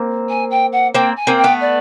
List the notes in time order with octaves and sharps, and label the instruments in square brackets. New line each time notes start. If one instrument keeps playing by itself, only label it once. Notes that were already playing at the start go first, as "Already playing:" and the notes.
Already playing: [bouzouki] A#3 C4
[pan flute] G#5
G5
F#5
[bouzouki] A#3 C4 [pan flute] G5
[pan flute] G#5
[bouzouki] A#3 C4
[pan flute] G5
[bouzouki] A3 B3
[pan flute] D5